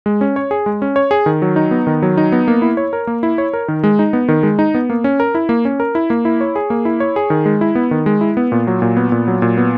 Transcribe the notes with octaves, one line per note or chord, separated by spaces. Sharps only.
G#3
C#4
C#5
G#4
G#3
C#4
C#5
G#4
D#3
F#3
D#4
B3
D#3
F#3
D#4
B3
A#3
E4
C#5
A#4
A#3
E4
C#5
A#4
D#3
G#3
D#4
B3
D#3
G#3
D#4
B3
A#3
C#4
A#4
E4
A#3
C#4
A#4
E4
A#3
E4
C#5
G#4
A#3
E4
C#5
G#4
D#3
G#3
E4
B3
D#3
G#3
E4
B3
A#2
F#3
A#2
B3
A#2
F#3
A#2
B3